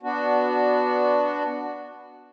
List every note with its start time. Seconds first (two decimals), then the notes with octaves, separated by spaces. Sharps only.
0.03 B3 D4 F#4